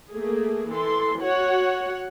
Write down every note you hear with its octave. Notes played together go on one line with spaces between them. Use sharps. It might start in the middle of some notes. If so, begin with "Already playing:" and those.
A3 A#3 G#4
E3 A4 C6
F#4 C#5 F#5